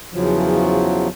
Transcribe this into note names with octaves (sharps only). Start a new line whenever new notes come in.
E2 C#3 F3 F#3